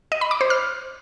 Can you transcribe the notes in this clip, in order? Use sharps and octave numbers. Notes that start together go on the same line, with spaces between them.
D#5
B5
D6
C5
F6